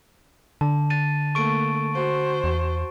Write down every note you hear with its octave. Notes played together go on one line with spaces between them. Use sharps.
D3 A5
A6 D#7
A3 A#3 C#6 D7
F#4 C5
E2